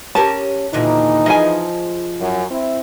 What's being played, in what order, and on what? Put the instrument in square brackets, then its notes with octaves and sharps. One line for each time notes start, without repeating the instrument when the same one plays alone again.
[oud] C#4 G4 A#4 [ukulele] A5
[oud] D#2 A#2 D3 [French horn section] E3 D#4
[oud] F3 G#4 [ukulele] D#5 G#5
[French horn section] F#2
C4 E4